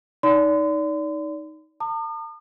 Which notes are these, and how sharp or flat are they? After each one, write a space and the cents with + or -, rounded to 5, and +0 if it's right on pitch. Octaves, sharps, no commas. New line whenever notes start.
D#4 +5 D5 -30 C6 -40
A5 +45 D#6 -45